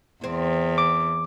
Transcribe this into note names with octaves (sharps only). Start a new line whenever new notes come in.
E2 C4
D6